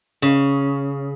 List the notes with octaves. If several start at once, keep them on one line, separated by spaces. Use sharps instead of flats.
C#3